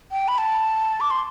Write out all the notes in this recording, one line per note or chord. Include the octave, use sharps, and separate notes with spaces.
G5
B5
A5
D6
C6